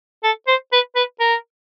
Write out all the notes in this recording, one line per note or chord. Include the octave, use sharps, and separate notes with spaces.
A4
C5
B4
B4
A#4